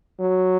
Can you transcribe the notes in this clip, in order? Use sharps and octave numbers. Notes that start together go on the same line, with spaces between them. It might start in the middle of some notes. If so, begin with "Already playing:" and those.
F#3